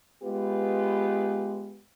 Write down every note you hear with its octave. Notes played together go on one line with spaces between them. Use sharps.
G#3 B3 F4 G4 B4